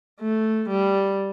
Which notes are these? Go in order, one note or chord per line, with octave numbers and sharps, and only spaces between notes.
A3
G3